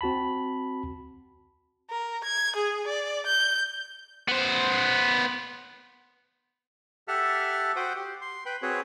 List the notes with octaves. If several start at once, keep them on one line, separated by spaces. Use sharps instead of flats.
C4 F#4 A5 B5
A#4
G#6
G#4
D5
G6
B3 C5
G4 A4 E5 F#5 A5 F6
F#4 C5 F#5 G5 D#6
G4
C6
B4 G5 B5
C4 F#4 G#4 B4 C#5